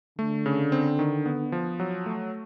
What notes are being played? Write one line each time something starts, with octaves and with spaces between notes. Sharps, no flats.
D3 A3
C#3
C4
D#3
B3
F3
F#3
A3